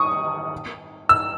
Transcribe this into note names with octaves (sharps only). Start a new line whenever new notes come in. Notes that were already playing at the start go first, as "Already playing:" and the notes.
Already playing: C#6 D#6
E6